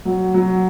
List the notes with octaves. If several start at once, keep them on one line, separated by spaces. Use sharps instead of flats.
F#3
F#3